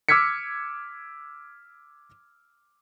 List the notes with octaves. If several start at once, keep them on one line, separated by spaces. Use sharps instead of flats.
D6 E6 F6 G#6 B6 C#7